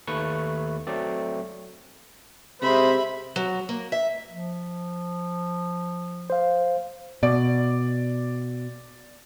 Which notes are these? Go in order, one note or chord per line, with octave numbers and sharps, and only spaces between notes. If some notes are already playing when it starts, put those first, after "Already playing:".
D#2 A3 B4 C#6
F#3 A3 C4 D5
C3 G#3 C5 E5 B5
F#3
A#3
E5
F3
C5 F5
B2 D5